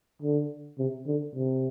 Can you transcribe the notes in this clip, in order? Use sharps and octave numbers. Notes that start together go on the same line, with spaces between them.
D3
C3
D3
C3